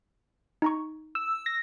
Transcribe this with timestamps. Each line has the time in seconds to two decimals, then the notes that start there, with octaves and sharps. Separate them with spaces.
0.62 D#4 A#5 C#6
1.15 E6
1.46 A#6